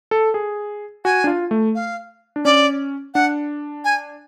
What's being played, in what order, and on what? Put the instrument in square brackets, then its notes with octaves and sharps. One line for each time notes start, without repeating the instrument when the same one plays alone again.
[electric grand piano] A4
G#4
[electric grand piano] F#4 [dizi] G#5
[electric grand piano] D4
F4
A3
[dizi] F5
[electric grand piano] D4
[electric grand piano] C#4 [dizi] D5
[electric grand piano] D4 [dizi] F#5
[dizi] G#5